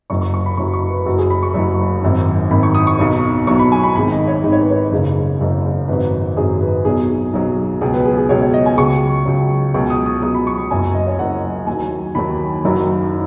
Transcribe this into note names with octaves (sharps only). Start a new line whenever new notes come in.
F#1 F#2 F#3 C#6
C#6
C#6
B5
F#1 F#2 F#3 C#6
C#6
B4
F#1 F#2 F#3 F#4
G#4
B5
C#6
F#1 F#2 F#3
G#1 F#2 D#3
G#1 F#2 D#3 B5
C#6
D#6
C#6
B1 B2 F#3
B1 B2 F#3 C#6
B5
G#5
B5
G#1 G#2 D#3 B5
D#5
C#5
G#1 G#2 D#3 D#5
C#5
B4
C#5
F#1 F#2 C#3
F#1 F#2 C#3
G#1 F#2 F#3 B4
G#1 F#2 F#3 G#4
B4
B1 B2 F#3 G#4
B1 B2 F#3
C#2 B2 F#3 G#4
B4
G#4
G#4
C#2 B2 F#3 C#5
C#5
D#5
G#5
C#2 C#3 F#3 C#6
C#2 C#3 F#3
C#2 B2 F#3 C#6
D#6
D#6
C#2 B2 F#3 D#6
B5
C#6
B5
F#1 F#2 F#3 G#5
D#5
C#5
F#1 F#2 F#3 F#5
D#2 D#3 F#3 G#5
D#2 D#3 F#3 B5
F#1 F#2 D#3 F#3